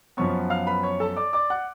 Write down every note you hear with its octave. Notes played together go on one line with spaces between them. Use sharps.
F#2 F3 B3 C#5 C#6
F5 F6
B4 B5
C#5 C#6
A4 A5
D5 D6
D5 D6
F#5 F#6